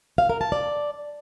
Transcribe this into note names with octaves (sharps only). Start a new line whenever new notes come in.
F5
A#4
A5
D5